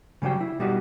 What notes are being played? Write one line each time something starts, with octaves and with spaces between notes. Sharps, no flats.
C#3 F#3 G3 C5 G5
E4
B2 G3 B3 D#4 F#4 G4